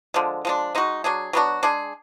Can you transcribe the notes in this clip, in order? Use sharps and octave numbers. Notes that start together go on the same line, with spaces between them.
D3 F3 G#3
F3 G#3 D4
G#3 D#4 F#4
F#3 D4 G#4
F#3 B3 D4 F#4
G#3 D4 G#4